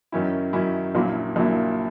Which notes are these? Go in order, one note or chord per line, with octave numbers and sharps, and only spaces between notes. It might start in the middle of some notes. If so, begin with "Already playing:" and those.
F#2 D#3 F#3 C#4 E4
F#2 D#3 F#3 C#4 E4
A#1 A#2 F#3 A#3 E4
A#1 A#2 F#3 A#3 E4